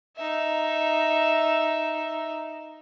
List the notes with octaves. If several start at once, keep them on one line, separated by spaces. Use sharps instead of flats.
D#4 E5